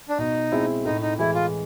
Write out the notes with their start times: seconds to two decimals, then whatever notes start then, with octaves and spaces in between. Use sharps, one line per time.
0.09 D4
0.18 B2 D#4
0.52 G#3 C4 E4
0.85 A2 D#4
1.02 D#4
1.19 E3 G#3 E4
1.35 F4